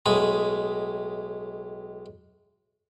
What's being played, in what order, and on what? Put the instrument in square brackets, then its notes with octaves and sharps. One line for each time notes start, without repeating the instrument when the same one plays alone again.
[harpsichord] B1 A2 G#3 B5 D#6